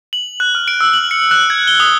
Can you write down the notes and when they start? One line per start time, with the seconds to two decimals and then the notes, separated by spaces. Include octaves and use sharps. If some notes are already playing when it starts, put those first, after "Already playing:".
0.13 F#7
0.40 F#6
0.55 F6
0.68 D7
0.81 E6
0.93 F#7
1.11 C#7
1.31 F#6
1.50 G#6
1.67 G7
1.80 D#6